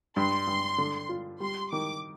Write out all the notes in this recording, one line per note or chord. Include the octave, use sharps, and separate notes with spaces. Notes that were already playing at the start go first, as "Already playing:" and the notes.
G2 C6
G2
D3
F4
G3 C6
D#3 D6